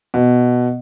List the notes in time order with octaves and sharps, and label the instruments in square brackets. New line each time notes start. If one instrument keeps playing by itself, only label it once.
[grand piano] B2